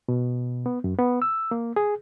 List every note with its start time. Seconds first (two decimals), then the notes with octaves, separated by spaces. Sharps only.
0.08 B2
0.66 B3
0.84 F#2
0.99 B3
1.22 E6
1.51 A#3
1.76 G#4